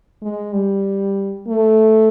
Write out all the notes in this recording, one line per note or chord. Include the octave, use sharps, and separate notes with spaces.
G#3
G3
A3